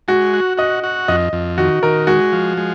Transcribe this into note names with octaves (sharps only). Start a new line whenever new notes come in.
G#3 F#4
F#4
F#4 D#5
F#4
F2 D#5
F2
D#3 F#4
D#3 A#4
G#3 F#4
F3
G#3